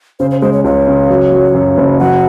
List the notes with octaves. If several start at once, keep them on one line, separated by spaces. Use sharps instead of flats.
C#3 C5
C5
G#3 C5
C#5
C#2 C#5
C#3
F#3
F#3
F#2
F#1
F#3 F#5